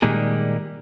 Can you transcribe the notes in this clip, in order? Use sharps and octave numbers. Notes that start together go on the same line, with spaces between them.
A#2 D#3 G3 G#3 A#3 G#4